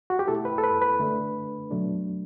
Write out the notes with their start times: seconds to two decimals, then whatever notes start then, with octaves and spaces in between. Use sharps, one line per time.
0.10 F#4
0.19 G4
0.27 B2 A3 E4 A4
0.45 B4
0.58 A4
0.64 B4
0.82 B4
0.99 D3 A3 D4
1.71 B2 F#3 A3 D4